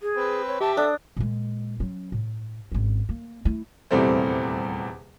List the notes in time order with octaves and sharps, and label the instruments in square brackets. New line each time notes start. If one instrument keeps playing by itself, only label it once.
[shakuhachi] G#4
[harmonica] C4 B4
[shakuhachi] C#5
[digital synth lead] G4 [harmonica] E5 G5 D6 [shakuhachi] A5
[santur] D4 [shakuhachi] A4 [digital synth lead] D#6
[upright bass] A#2 G#3
F#3 C#4
A2
G#1 C#4
A#3
A3 E4
[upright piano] D#1 E2 C3 G3 A3 C4